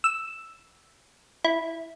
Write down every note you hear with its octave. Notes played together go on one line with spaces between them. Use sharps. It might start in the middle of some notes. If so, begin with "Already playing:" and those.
E6
E4